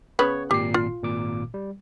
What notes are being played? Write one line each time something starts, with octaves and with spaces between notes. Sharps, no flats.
C#3 B3 C#5 B5
G#1 A#2 G4 C7
F4
G#1 A#2 D6
G3